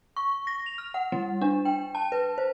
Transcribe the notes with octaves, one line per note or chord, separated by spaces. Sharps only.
C#6
A#6
F7
F6
F#5
G3
D4
G5
A5
B4
C5